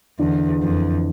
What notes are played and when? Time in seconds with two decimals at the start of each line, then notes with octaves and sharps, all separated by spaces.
0.19 E2 D3
0.62 F2 E3